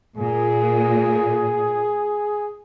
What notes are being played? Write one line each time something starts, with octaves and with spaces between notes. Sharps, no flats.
A#2 G#4